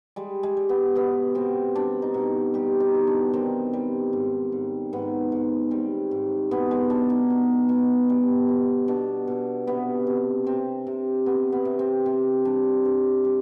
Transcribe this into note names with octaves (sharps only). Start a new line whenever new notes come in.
G3 G#3
G#3
G3
B3
B2 B3
B2 C4
G3 D4
D#4
B2
G3 G4
D#4
B2
D4
D#3 C4
G3
G#2
G#2
G#2 B3
G#2
G3 C4
G#2
B2 B3
G#3
B2 D4
D#4
B2
B2
G3
B2
B2 D4
B2
C3 B3
C3
C3 C4
C3
C3 B3
B3
C3
C4
C3 C4
G3 D4
G2
G3